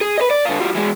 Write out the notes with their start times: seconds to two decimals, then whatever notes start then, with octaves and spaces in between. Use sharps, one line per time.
0.01 G#4
0.18 B4 D#5
0.31 D5
0.45 D3 F4
0.60 F3 G3
0.75 E3 G#3